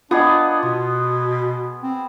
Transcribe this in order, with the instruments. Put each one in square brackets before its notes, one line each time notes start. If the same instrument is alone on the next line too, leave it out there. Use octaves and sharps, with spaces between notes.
[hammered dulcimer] B3 G#4 [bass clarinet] D4 [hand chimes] F4 D#5
[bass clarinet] B2 [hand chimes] C6
[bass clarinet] C4